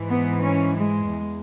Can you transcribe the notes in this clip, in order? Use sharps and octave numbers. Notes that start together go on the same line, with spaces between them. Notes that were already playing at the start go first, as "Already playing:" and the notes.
Already playing: G#2 E3
B3
C#4
G#3
E2